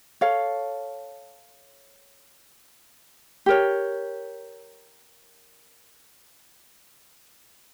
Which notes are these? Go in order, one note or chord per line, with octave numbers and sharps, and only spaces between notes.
A4 C#5 F5
G4 A#4 C#5